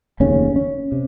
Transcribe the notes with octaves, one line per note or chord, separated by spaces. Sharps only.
F1 D#2 C#3 C#4
C#4
C3